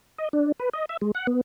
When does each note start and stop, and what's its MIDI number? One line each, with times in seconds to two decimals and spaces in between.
0.18 0.29 75
0.33 0.52 62
0.60 0.69 71
0.73 0.85 75
0.89 0.97 76
1.01 1.11 56
1.15 1.27 78
1.27 1.41 59